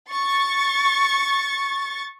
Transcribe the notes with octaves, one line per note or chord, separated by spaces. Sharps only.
C#6 A6